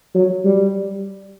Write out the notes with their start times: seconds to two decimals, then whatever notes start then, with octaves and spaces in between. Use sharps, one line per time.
0.15 F#3
0.45 G3